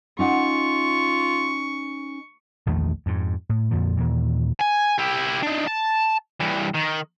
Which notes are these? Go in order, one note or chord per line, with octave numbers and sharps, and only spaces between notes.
C#4 D#4 F4 F#5 C#6
A#1 E2 D#3 A3
F2 G#2
A2
F2 A#2 D3 F3
D#2 A#2 E3
G#5
E4 G4
D4 D#4
A5
G2 E3
D#3